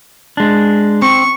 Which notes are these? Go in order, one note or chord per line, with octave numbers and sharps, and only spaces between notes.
G#3 D4
C4 C#6